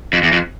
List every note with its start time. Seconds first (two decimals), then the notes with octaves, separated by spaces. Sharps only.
0.13 F2
0.23 E2
0.32 F2